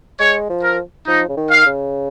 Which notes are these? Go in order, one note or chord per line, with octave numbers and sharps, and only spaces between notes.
G#3 C#5
F3
A#4
F3 D#4
C#3
D#3
F5
C#3